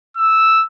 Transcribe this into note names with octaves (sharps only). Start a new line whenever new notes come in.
E6